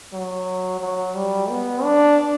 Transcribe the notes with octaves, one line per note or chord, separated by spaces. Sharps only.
F#3
F#3
G3
B3
D4